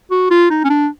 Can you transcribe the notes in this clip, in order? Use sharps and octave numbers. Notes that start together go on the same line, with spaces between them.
F#4
F4
D#4
C#4
D4